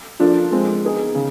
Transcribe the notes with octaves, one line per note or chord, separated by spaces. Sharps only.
F3 A#3 D4 F4 A4
F3 G#3 C4
B3 D#4 G#4
C#3